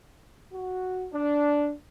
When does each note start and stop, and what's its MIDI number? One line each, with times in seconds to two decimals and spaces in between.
0.53 1.08 66
1.13 1.72 62